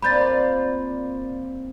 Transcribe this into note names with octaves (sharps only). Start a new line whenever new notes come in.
A#3 C4 F4 D5 B5 G6 A6